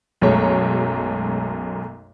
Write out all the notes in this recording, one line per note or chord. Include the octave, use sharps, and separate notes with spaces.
B1 F#2 G#3 A3 C#5